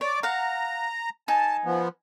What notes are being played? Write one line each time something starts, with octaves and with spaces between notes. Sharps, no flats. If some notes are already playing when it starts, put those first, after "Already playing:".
C#5 D5 D6
F5 F#5 A#5
D#4 G#5 A5
F3 B3